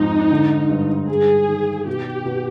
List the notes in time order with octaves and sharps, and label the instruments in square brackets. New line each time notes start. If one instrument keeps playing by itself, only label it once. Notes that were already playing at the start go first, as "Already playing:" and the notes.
Already playing: [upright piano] F2 G#2 F4 [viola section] D#4
[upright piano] D3
G2
[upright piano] G2 [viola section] G#4
[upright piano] D#3
[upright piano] B2 [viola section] G4
[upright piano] B2